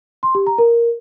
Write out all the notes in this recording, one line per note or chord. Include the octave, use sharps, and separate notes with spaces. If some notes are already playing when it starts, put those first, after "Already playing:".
C6
G4
A#5
A#4